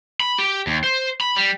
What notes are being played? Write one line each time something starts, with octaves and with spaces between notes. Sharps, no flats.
B5
G4
D#2
C5
B5
G3